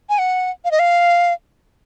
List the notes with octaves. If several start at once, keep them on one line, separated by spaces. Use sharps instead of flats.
G#5
F#5
F5
D#5
F5